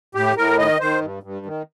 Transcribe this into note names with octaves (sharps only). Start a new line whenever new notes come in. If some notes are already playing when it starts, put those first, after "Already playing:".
A2 G4
A2 A#4
D#3 D#5
D#3 C5
G2
G2
D#3